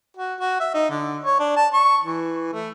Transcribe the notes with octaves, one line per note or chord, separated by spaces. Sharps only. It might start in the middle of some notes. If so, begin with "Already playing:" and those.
F#4
F#4
E5
D#4
D3
C#5
D4
A5
C#6
E3
A3